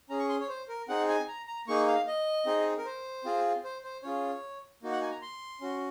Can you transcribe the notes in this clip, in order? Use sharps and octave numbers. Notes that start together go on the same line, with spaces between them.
C#4 G#4 A#5
C#6
C6
C#5
C5
A#4
C4 D#4 G#4 F#5
G#5
A#5
A#5
A#3 D#4 G#4 C#6
F5
D#5
C4 D#4 G#4
A#4
C5
C4 F4 G#4
C5
C5
C#4 F4 G#4 C#5
A#3 D#4 F#4
F#5
G#5
A#5
C6
C#4 F#4